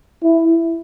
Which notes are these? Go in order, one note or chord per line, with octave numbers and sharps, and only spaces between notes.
E4